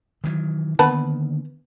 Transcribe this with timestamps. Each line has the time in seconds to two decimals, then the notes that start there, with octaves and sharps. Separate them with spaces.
0.24 D#3 E3 F#3
0.79 D3 D#3 A#3 B3 B4 A5